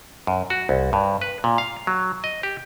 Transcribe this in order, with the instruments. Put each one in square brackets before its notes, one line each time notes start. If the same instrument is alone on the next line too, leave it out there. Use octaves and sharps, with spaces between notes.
[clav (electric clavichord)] F#2
F#4
C2
G2
B4
A#2
F5
F#3
D#5
G4